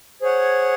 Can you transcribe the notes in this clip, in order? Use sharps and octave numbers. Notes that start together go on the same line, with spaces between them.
G#4 C5 C#5 F#5